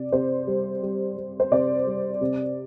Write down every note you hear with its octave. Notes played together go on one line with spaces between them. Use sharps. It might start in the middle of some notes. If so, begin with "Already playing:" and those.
Already playing: C3 D5
C3 C5
G3
G3
G3
C5
C3 D5
G3
C3